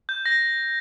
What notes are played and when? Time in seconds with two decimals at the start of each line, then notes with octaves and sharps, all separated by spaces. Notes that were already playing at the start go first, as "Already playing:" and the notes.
0.09 G6
0.26 A#6